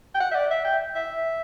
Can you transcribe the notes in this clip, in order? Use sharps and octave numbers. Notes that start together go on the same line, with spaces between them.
G5
F#5
E5
D5
E5
G5
E5